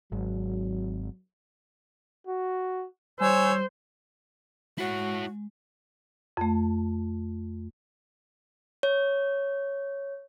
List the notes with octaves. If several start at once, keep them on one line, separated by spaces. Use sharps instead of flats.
G#1 F#3
F#4
G3 C5 C#5 G#5 E6
G#3 E4 F#4 C#5
F2 A3
C#5